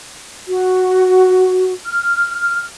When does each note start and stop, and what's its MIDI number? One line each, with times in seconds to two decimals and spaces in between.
0.48 1.72 66
1.86 2.65 89